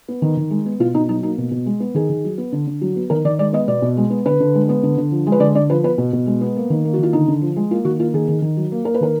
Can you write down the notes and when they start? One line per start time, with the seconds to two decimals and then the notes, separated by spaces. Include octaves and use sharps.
0.08 B3
0.22 D#3
0.37 D#3
0.51 G#3
0.66 B3
0.80 B2 F4
0.94 B2 D#4
1.08 F#3 D#4
1.23 A#3 D#4
1.38 B2
1.51 B2
1.66 G#3
1.80 B3
1.94 D#3 G#4
2.10 D#3
2.24 F#3
2.38 B3
2.52 D3
2.67 D3
2.81 F#3
2.96 B3
3.10 D#3 A#4
3.25 D#3 D5
3.39 G#3 D5
3.53 B3 D#5
3.67 B2 D5
3.82 B2
3.97 G#3
4.10 B3
4.25 D3 B4
4.40 D3
4.55 G#3
4.69 B3
4.83 D3
4.97 D3
5.11 F3
5.27 G#3
5.32 B4
5.40 D3 D5
5.55 D3 D5
5.70 F3 B4
5.84 B3 B4
5.98 B2
6.13 B2
6.26 G#3
6.41 B3
6.56 A#3
6.70 D#3
6.85 A#3
6.93 F#4
6.98 D#3 F4
7.13 D3 D#4
7.28 D3
7.42 F3
7.56 G#3
7.71 A#3 F4
7.85 D#3 F#4
7.99 A#3 F4
8.14 D#3 G#4
8.28 D#3
8.42 D#3
8.57 F#3
8.72 A#3
8.85 A#3 A#4
8.95 B4
9.01 D#3 A#4